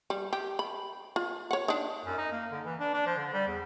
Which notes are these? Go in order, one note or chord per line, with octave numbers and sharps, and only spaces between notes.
G3
G4
B5
F4
C#5 F#5
D4 D#4
F#2
D#4
A#3
D3
E3
D4
D4
F3
D3
G3
E2